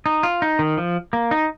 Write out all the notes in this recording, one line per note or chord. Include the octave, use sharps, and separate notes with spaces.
D#4
F4
D#4
D#3
F3
A#3
D#4